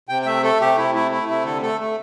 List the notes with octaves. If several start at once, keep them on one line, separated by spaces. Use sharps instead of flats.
C3 G5
G5
A3 E5
A3 A4
C3 G4
C3 E4
A3 E4
A3 E4
C3 E4
D3 A4
A3 A4
A3